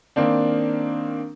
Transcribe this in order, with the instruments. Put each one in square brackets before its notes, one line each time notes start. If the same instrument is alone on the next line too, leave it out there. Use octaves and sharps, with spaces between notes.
[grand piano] D#3 A#3 C4 D4